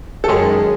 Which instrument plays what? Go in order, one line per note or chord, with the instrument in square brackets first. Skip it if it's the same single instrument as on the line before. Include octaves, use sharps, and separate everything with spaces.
[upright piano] A4
[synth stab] F#2 D#3 G#3 C#4 [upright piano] G#4